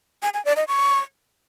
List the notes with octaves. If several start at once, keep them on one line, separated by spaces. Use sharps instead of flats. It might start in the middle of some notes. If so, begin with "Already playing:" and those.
G#5
G#5
D5
D#5
C#6